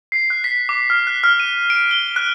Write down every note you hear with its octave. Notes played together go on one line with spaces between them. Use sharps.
C7
F#6
B6
D6
F6
F#6
F6
D#7
D7
G7
F#6